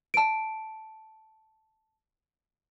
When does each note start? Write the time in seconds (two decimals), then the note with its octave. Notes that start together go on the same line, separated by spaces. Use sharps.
0.14 A5 D7